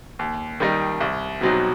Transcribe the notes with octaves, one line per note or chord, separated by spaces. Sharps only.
D#2
D#3 G3 D#4
C2
B2 F#3 C4 D#4